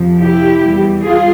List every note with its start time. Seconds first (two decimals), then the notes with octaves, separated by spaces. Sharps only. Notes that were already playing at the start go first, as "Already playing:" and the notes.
Already playing: F2 C3 F3
0.20 E4 G4
0.62 E2 E3 G3
1.02 F4 G#4